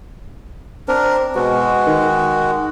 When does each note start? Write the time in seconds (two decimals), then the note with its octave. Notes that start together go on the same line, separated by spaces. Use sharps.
0.88 C4 D4 A#4
1.35 B2 G#3 F#4
1.87 D#3